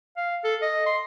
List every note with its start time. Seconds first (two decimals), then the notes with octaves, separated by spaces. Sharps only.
0.17 F5
0.44 A4
0.62 D#5
0.86 C6